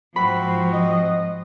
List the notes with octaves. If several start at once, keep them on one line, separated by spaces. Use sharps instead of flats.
G#2 F3 C4 F#4 B5
D#5